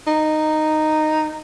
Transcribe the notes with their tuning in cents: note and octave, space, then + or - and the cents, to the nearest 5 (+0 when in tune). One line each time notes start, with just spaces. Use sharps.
D#4 -10